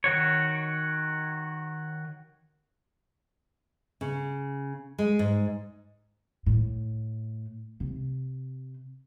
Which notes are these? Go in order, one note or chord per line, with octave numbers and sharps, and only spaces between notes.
D#3 F#4 C#5
C#3
G#3
G#2
A2
C3